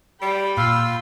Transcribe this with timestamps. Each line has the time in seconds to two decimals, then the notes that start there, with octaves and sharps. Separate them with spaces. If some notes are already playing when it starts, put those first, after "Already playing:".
0.22 G3 G5 B5
0.57 A#2 F4 E6